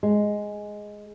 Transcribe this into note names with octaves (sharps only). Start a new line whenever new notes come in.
G#3